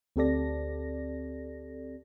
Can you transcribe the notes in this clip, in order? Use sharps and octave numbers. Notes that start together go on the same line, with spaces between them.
D2 C4 G4 A4 D5 A#6